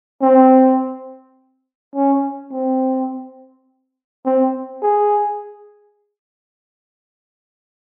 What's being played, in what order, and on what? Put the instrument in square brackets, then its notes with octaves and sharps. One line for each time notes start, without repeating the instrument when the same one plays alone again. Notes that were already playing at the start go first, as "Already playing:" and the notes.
[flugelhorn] C4
C#4
C4
C4
G#4